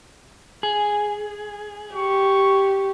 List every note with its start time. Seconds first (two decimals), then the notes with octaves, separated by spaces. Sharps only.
0.63 G#4
1.95 G4 C#6